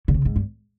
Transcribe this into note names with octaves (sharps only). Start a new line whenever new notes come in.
D3
C#3
G#2
G2